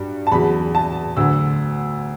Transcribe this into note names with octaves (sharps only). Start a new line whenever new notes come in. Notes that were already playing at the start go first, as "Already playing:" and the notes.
Already playing: G2 F#3
A5
E2 C#3 F#3 B5
A5
D2 D3 F#3 E6